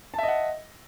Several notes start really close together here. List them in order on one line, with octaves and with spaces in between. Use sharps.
A5 E5 D#5 F#5